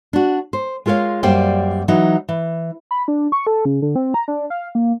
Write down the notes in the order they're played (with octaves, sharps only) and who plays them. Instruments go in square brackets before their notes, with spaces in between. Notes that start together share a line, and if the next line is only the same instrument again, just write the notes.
[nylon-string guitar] D4 F#4
C5
G#3 F4 A#4 C#5 F5
F#2 G3 A#3 C5 D5 G5
E3 F#3 D#4
E3
[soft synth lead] B5
D4
C#6
A4
C#3
D3
C4
A#5
D4
F5
A#3